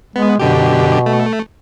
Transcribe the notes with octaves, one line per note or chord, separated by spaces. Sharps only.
G#3 B3
F#2 B2 D3 G4
A3